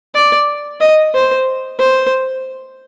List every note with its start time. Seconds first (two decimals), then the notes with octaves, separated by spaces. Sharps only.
0.15 D5
0.81 D#5
1.14 C5
1.79 C5